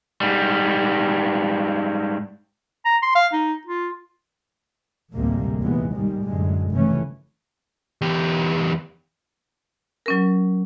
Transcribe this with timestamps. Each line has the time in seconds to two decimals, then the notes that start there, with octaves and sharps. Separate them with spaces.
0.21 G#2 G3
2.85 A#5
3.03 C6
3.15 F5
3.33 D#4
3.67 F4
5.14 A1 D2 C3 G3 G#3 A#3
5.60 D#2 A#2 E3 G#3 B3
5.93 G#2 D#3 G3 G#3
6.25 F#2 A2 D3 G#3
6.71 F1 G2 C#3 E3 A3 C#4
8.01 E2 G4
10.06 F#3 C#4 A#4